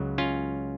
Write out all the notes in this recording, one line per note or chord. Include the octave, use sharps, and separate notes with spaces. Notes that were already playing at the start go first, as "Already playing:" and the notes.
Already playing: C#2 C#3 F#3
C#4 F4